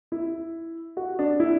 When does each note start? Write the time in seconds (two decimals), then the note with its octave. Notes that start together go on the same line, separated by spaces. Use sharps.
0.12 E4
0.97 F#4
1.19 D4
1.40 E4